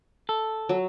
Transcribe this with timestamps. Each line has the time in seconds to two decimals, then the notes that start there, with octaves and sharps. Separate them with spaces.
0.29 A4
0.69 F#3